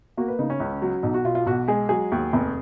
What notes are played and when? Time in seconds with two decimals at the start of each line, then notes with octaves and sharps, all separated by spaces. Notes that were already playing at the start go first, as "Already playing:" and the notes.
0.17 A#3 F#4
0.28 B4
0.39 C#3 D#4
0.50 C#4
0.60 C#2
0.82 F#3
1.03 B1 D#4
1.14 F#4
1.25 B2 F4
1.35 F4
1.47 B1 F#4
1.68 G#3 G#4
1.89 F#3 G#4
2.12 D#2
2.33 F1